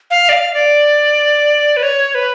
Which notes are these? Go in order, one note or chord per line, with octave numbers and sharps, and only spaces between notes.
F5
D5
F5
D5
B4
C#5
B4